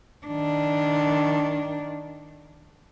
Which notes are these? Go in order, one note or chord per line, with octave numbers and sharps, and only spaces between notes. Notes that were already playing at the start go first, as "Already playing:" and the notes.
D#3 D4